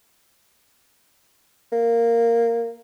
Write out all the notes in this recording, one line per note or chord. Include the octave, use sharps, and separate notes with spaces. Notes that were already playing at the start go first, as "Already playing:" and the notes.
A#3